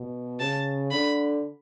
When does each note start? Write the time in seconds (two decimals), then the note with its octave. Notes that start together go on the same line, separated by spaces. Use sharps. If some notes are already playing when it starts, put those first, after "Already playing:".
Already playing: B2
0.40 C#3 A5
0.92 D3 B5